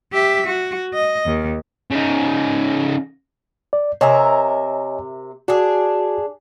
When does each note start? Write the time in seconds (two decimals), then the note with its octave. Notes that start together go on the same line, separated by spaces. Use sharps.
0.12 G4 E5
0.46 F#4
0.93 D#5
1.25 D#2
1.91 C#3 D#4
3.73 D5
4.01 C3 A#4 C#5 D#5 E5 G#5
5.48 D4 F#4 G#4